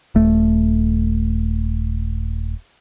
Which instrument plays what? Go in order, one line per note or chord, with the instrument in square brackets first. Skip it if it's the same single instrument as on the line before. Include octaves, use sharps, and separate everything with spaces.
[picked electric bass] D#1 A3